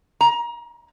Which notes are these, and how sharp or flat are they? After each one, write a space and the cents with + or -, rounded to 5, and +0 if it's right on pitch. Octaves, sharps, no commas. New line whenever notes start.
A#5 +30